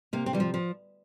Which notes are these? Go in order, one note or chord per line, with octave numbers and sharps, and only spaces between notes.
C3 A#3
C4
E3 G3
F3
F3